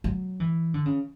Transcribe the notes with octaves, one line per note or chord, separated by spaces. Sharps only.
F#3
E3
D3
C#3